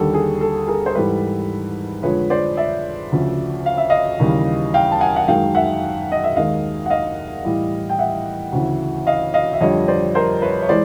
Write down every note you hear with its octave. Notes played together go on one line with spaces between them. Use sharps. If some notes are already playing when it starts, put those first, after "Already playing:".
Already playing: D#2 D3 G3 A4
G#4
A4
G#4 A#4
C5
G#2 E3 G3 A4 B4
F2 D3 F3 G#3 B4 C#5
C5 D5
D5 E5
D2 C#3 F3
F5
E5
D#5 F5
D#2 C#3 E3 G3
F5 G5
A5
F#5 G#5
F#5
F#2 D#3 G#3 F5 G5
E5 F#5
D#5
E5
D#2 D#3 G#3 D#5 F5
F#5
D#5 F5
A2 E3 G3
G5
E5 F#5
D2 C#3 E3
D#5 F5
D#5 F5
E5
F2 D3 G3 C#5 D#5
C5 D5
A#4 C5
B4 C#5
C#5
E3 G#3 C5 D5